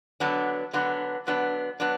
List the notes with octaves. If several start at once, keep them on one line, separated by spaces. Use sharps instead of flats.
D3 F#3 B3 D4
D3 F#3 B3 D4
D3 F#3 B3 D4
F#3 B3 D4